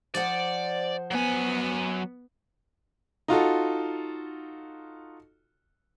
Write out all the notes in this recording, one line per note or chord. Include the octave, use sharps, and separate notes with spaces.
F3 C5 D5 F#5
F#3 B3 G#5
D#4 F4 F#4 A4